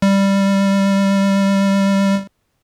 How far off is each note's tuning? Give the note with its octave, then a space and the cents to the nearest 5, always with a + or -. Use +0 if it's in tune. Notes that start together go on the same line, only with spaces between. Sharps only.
G3 +5